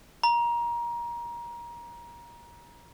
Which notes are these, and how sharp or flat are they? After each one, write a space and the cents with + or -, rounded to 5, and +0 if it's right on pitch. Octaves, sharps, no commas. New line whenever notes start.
A#5 +25